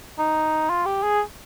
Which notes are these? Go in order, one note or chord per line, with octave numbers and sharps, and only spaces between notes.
D#4
F4
G4
G#4